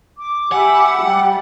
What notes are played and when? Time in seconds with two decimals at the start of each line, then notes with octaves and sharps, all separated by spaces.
0.18 D6
0.52 G4 E5 F#5 G#5 B5
1.04 G3 G5